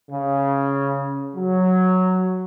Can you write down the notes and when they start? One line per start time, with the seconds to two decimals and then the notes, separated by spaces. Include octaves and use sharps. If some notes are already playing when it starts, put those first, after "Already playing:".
0.10 C#3
1.36 F#3